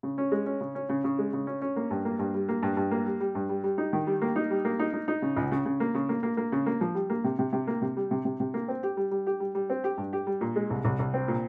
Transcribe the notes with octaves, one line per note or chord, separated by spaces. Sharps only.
C#3
C#4
G#3
C#4
C#3
C#4
C#3
C#3
G#3
C#3
C#4
C#4
A#3
G2
A#3
G2
G3
A#3
G2
G2
A#3
G3
G3
G2
G3
G3
D#4
D#3
G3
A#3
D#4
G3
A#3
D#4
D#4
D#4
C#3
C#2
C#3
C#3
A#3
C#3
A#3
A#3
A#3
C#3
A#3
F3
G3
A#3
C3
C3
C3
A#3
C3
G3
C3
C3
C3
A#3
C4
G4
G3
G3
G4
G3
G3
C4
G4
G2
G4
G3
A#2
G#3
C2
C2
C2
C4
A#2